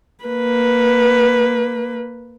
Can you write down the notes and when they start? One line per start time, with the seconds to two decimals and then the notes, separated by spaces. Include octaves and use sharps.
0.25 A#3 B4